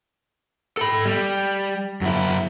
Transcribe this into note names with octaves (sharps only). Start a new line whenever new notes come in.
A4 B5
G3
F#2 E4